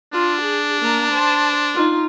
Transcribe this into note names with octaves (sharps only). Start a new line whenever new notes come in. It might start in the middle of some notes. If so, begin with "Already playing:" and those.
D4 F4
G#4
A#3 A#5
C5 A5
D#4 F4